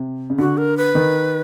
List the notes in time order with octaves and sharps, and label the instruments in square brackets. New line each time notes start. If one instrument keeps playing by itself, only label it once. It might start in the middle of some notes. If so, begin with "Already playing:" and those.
Already playing: [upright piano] C3
C#3
[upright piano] D3 [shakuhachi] F#4
[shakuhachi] A#4
B4
[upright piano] D#3